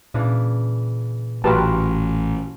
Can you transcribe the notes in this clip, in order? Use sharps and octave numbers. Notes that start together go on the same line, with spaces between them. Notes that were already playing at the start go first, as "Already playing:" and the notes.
A#2 C#3 E3 D4
A1 F#3 F4 G4 A#4 B4 A5